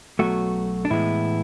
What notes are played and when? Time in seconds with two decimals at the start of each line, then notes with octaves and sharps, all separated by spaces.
0.19 B1 B2 F#3 A3 F#4
0.85 D4
0.90 A2 E3 G#3 B3 E4